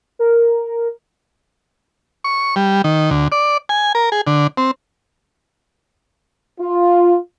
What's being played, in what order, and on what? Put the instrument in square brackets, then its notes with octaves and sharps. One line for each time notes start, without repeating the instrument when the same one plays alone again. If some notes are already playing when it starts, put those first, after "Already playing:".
[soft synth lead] A#4
[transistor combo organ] C#6
G3
D#3
D2
D5
G#5
A#4
G#4
D3
C4
[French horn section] F4